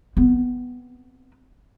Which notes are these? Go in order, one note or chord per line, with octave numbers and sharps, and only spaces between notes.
B3 C4